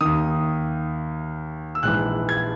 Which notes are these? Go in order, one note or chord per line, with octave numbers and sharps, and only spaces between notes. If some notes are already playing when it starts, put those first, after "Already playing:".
D#2 D#3 D#6
E6
A#1 G#2 E3 F#6
G#6